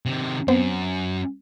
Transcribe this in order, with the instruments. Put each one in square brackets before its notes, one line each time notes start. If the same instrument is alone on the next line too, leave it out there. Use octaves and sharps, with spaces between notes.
[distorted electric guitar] C3 D#3
[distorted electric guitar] F#2 [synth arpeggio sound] B3 C4 C5